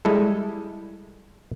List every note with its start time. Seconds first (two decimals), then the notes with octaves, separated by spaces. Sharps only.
0.05 G3 G#3 E4 A4